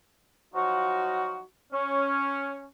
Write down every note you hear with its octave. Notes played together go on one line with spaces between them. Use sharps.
F3 F#3 D#4 F4 F#4
C#4